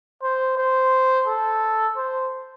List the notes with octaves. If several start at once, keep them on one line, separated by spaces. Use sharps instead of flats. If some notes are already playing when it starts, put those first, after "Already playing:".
C5
C5
A4
C5